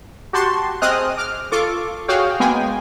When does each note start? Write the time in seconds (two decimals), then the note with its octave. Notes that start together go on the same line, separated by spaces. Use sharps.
0.33 F#4 G4 A5 C6 C#6
0.82 C4 G#4 D#5 D#6 F6 F#6
1.17 D6 F6
1.52 F4 A4 C#6 D6
2.08 F#4 G#4 C#5 F5 G5
2.40 G#3 A#3 B3 G#4 G5 G#5